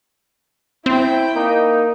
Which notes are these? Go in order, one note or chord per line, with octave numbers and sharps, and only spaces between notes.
C4 E4 G5
A#3 D#4